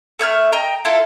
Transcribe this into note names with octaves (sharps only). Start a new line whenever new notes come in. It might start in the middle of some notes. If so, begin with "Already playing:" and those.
A3 E5 G#5 F6
D#5 G5 A#5
E4 F4 A4